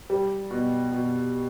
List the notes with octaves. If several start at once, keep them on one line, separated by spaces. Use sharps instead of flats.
G3
B2
B2